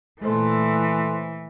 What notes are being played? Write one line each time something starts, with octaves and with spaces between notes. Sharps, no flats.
A#2 E3 A3 A4 C5 C6